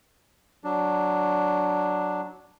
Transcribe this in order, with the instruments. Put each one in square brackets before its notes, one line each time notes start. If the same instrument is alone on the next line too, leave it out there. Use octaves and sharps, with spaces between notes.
[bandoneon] F#3 D4